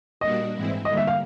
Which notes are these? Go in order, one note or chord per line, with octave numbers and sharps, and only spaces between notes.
A#2 G3 A#3 D4 F#4 D#5
G#2 E3 G#3 C4 E4
D3 G3 A#3 D#5
E5
F5